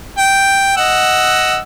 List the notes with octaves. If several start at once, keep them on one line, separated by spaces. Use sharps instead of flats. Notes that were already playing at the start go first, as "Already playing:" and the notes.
G5
D#5 F#5 E6